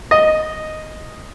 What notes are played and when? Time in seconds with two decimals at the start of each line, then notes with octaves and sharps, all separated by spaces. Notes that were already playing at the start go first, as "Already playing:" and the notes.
0.11 D#5